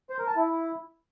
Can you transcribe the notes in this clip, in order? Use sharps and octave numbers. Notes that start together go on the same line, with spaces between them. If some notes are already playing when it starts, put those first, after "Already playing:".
C5
A#4
A5
E4